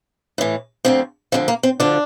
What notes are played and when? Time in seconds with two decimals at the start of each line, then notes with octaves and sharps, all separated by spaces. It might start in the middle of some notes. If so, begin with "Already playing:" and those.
0.38 A2 E3
0.85 D2 D3 F3 C4
1.32 D2 D3 F3 C4
1.48 A#3
1.63 C4
1.80 D2 D3 F3 D4